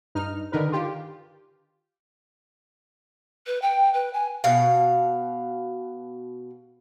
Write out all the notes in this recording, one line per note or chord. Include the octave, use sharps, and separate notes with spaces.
G2 D#4 F6
D3 D#3 D#4 A#4 B4
F4 G4
B4
G5
B4
G#5
B2 F5